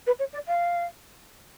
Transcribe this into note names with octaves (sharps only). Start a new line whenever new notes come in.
B4
C#5
D5
F5